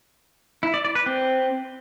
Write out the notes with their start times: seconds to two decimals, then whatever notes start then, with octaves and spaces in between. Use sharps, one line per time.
0.63 E4
0.74 D5
0.85 D5
0.95 B4
1.06 C4